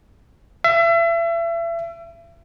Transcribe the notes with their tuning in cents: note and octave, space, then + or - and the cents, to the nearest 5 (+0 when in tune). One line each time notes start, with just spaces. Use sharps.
E5 +35